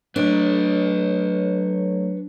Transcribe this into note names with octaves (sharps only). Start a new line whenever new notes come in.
F#3 A3 D4 B4 C#5